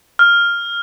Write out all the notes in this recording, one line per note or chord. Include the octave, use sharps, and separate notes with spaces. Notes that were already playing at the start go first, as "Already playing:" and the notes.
F6